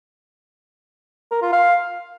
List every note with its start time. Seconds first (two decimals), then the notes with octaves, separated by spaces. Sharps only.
1.31 A#4
1.42 F4
1.53 F5